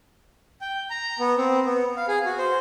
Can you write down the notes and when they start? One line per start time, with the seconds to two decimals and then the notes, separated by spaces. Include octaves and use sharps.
0.61 G5
0.90 A#5
1.19 B3
1.38 C4
1.66 B3
1.97 F5
2.08 G#4
2.25 F#4
2.38 C5